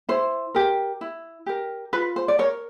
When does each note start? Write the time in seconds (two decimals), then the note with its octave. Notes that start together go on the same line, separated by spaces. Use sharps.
0.09 E4 C5
0.55 G4 A#4
1.01 E4
1.46 G4 A#4
1.93 F4 B4
2.16 C5
2.28 D5
2.39 A#4 C#5